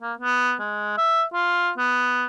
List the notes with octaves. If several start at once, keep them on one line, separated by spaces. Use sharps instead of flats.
A#3
B3
G#3
E5
F4
B3